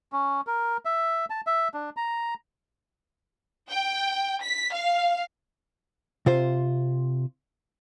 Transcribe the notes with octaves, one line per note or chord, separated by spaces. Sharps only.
C#4
A#4
E5
A5
E5
D4
A#5
G5
B6
F5
C3 F4 C5